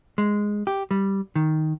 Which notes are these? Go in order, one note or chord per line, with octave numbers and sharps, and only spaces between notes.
G#3
G4
G3
D#3